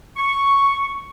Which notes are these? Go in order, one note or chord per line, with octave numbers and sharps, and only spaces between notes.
C#6